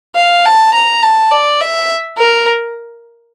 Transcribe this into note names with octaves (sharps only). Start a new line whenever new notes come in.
F5
A5
A#5
A5
D5
E5
A#4